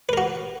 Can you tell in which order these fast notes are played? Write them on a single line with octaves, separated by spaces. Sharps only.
B4 A#4 F#4